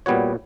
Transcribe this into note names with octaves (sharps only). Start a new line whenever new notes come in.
A#2 G3 B3 F#4 C#5